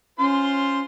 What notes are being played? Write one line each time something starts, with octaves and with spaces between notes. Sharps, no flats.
C#4 F4 C5 C6